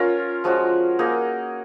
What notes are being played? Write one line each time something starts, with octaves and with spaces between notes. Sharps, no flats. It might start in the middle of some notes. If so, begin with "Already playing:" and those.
Already playing: C#4 F4 A#4 C#5
F3 G#3 C#4 F#4
A#3 D#4 G#4